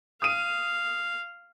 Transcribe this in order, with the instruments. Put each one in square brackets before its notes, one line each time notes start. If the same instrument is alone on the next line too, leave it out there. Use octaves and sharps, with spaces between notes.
[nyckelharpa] F5 [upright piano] D#6 D#7